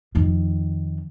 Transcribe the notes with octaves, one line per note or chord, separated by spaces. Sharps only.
F2 D#3